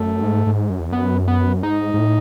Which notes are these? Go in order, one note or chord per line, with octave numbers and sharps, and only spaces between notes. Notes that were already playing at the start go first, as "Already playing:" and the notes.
Already playing: F#2 A3
G#2
G#2
F#2
E2
F#2 B3
B3
G#2 D#4
G#2
A2